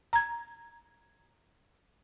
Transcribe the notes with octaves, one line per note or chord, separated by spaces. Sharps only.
A#5 G#6